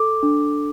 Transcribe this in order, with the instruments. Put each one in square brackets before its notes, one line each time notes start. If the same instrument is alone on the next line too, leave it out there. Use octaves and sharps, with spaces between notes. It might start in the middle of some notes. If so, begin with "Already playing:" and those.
Already playing: [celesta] A4 D6
D4